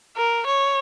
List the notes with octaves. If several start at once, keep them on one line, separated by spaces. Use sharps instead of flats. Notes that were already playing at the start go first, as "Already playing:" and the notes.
A#4
C#5